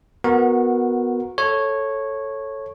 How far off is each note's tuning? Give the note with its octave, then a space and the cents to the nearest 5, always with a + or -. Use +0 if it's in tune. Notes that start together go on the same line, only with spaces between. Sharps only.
B3 +0 F#4 -15 A#4 +0
A4 +0 C#5 -10